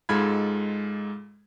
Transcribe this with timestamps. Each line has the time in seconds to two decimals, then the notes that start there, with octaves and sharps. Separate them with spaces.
0.09 G#2 G#3 F4 A4 B5 G#6